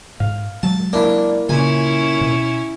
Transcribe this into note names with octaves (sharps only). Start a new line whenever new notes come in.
G#2 F5
F#3 G#3 A5
A#3 D4 E4 A#4
A#2 C#3 C#4 E4 G#5
B2